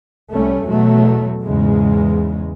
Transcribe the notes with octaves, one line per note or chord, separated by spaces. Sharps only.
C2 G3 A3 C#4
E2 B2 F#3 A3
E2 G#2 C#3 G#3